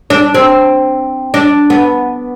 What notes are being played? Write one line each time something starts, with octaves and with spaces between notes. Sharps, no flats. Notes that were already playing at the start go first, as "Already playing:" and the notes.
D4
C4
D4
B3